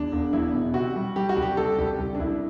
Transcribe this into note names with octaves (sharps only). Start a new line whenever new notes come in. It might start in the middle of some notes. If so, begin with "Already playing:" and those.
Already playing: E2 D4
E1
E2 E4
B2
C3 F#4
G3
G3 G4
F#4
C2
G4
C2 A4
C2 G4
C2
D4
C2 E4